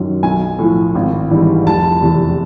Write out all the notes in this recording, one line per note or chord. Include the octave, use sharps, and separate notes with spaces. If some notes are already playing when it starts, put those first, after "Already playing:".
Already playing: F#2 D#3 F#3
B1 G#5
A2 F3
G#1
G#2 E3 G3
F1 A5
E2 C3